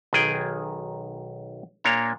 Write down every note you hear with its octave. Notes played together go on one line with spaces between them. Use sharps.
B1 D#3 G#4 G5 G#5
A#2 A#3 D4 C#5 A#5